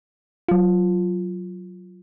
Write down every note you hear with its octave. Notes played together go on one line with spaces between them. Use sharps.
F#3 F4